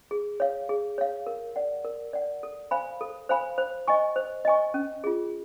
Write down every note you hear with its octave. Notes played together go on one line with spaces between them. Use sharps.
G#4
C#5 F5
G#4
C#5 F5
A#4
D5 F#5
A#4
D5 F#5
A4
C5 F5 G#5 B5
A4
C5 F5 G#5 B5
C5
D#5 G#5 C#6
C5
D#5 G#5 C#6
C#4
F4 G#4